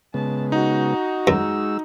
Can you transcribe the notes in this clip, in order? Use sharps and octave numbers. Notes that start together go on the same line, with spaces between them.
C#3 G#3 B3 A5
D#4 F#4
F#2 G#3 E6